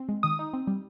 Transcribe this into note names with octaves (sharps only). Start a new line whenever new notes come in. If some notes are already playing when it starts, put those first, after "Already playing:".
Already playing: C4
G#3
D#3 D#6
D#4
C4
G3